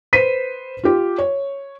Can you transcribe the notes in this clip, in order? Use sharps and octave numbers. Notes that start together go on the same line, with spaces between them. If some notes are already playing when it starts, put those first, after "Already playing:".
B4 C5 B6 D#7
F4 G4
C#5